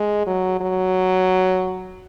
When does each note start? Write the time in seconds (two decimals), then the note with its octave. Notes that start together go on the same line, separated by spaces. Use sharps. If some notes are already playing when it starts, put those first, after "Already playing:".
Already playing: G#3
0.27 F#3
0.61 F#3